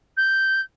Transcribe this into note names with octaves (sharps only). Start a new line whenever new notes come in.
G6